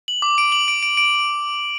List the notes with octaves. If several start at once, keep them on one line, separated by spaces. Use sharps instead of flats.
F#7
D6
D7
F#7
D7
D7
D7